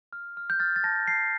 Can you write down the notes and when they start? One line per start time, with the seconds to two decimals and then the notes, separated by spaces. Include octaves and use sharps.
0.13 F6
0.37 F6
0.50 G6
0.60 F6 A6
0.76 A6
0.84 A5 A#6
1.07 A5 C7